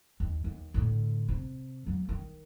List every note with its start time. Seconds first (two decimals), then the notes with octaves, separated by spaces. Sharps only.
0.20 D#2
0.44 D#2
0.74 A2 D3
1.29 C3
1.86 F#3 A#3
2.09 D#3